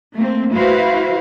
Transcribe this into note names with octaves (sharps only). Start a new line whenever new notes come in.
A3 A#3 C4
E4 F#4 B4 C5 F5